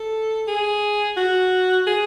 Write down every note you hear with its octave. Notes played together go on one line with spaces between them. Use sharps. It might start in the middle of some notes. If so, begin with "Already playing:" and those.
Already playing: A4
G#4
F#4
G#4